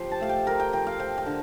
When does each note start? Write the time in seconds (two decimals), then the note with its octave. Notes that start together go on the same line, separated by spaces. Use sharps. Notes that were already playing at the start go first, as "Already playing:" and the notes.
Already playing: F3 G4 C5
0.11 A5
0.21 A3 F5
0.29 G5
0.47 A3 A#4
0.60 G5
0.73 F3 G5
0.87 F5
0.99 F3 G5
1.18 G5
1.26 D3